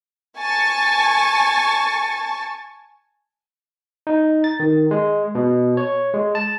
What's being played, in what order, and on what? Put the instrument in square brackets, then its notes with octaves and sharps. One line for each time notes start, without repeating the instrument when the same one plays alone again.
[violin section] G#5 A5 C#6 A6
[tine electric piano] D#4
A6
D#3
G#3
B2
C#5
G#3
A5